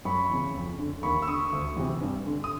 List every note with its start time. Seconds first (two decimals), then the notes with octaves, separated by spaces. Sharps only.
0.05 F#2 B5 C#6
0.30 C#3 E3
0.55 F2
0.79 D3
1.03 D#2 B5 C#6
1.22 E6
1.28 D3 C#6 D#6
1.53 D2
1.76 C3 E3
2.01 G2
2.26 D3
2.44 D#6